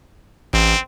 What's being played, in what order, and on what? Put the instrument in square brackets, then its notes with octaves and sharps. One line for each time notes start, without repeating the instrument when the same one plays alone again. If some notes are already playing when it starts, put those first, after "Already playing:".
[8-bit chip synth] A1 [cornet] C4